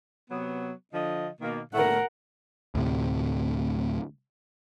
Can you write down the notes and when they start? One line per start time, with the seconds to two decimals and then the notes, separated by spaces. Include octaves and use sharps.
0.30 C3 F#3 B3
0.94 D3 F3 D#5
1.41 B2 D#3 A#3
1.74 A2 A3 A#4 F#5
2.75 D2 A2 C3